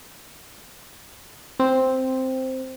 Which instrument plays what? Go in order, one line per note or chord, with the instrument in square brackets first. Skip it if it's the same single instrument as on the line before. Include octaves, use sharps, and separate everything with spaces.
[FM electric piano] C4